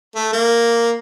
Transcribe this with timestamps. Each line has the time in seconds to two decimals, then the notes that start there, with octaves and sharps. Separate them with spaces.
0.15 A3
0.32 A#3